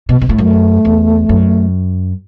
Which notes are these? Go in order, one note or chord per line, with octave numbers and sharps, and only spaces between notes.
B2
B2
A2
F#2 A3
E2
F#2